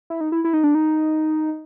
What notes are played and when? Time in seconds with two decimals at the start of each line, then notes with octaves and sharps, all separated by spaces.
0.10 E4
0.21 D#4
0.32 E4
0.45 E4
0.53 D#4
0.64 D4
0.75 D#4